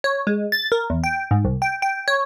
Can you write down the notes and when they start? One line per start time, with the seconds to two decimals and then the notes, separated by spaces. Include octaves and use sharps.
0.04 C#5
0.27 G#3
0.52 A6
0.72 A#4
0.90 E2
1.04 G5
1.31 G#2
1.45 C2
1.62 G5
1.82 G5
2.08 C#5